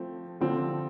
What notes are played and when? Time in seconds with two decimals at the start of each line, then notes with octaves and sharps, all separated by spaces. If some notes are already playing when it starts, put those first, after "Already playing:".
Already playing: F3 A3 C4
0.41 D3 F3 C4